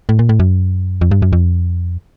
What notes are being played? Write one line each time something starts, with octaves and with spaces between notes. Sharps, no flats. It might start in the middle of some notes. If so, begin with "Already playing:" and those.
A2
A#2
A2
F#2
F2
G2
F#2
F2